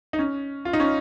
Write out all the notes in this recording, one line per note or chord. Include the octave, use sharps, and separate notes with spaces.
D#4
C#4
F4
D#4
C#4